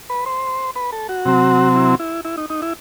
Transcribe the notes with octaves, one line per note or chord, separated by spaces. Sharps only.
B4
C5
B4
A4
F#4
C3 F#3 C4
E4
E4
E4
D#4
D#4
E4